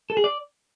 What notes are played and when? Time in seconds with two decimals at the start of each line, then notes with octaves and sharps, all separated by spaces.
0.10 A4
0.17 G#4
0.24 D5